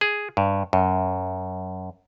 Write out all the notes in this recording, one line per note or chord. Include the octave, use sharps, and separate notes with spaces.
G#4
G2
F#2